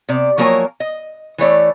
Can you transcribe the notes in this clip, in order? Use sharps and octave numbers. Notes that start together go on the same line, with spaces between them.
C3 D5
F3 F#3 A#3 A#4 C#5 G#5
D#5
E3 A3 C#5 D5